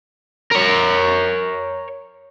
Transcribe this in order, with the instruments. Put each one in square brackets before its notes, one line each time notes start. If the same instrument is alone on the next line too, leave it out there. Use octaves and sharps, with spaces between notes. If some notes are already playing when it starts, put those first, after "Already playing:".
[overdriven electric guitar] A#4 C#5